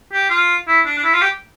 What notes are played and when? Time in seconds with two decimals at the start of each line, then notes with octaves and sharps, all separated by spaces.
0.13 G4
0.30 F4
0.68 E4
0.86 D4
0.98 D4
1.04 E4
1.13 F4
1.22 G4